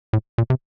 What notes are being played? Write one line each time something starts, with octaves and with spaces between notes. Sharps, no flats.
A2
A#2
C3